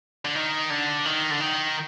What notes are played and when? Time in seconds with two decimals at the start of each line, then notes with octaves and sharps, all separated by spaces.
0.25 D3
0.35 D#3
0.70 D3
1.05 D#3
1.31 D3
1.40 D#3